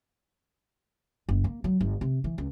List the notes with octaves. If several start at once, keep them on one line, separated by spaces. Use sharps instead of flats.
F#1
A#3
F#3
G1
C3
E3
C#2